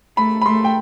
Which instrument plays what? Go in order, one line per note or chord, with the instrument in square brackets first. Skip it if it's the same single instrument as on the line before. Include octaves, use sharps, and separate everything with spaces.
[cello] A3 [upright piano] B5
[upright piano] B5
[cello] A3 [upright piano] C6
[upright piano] G5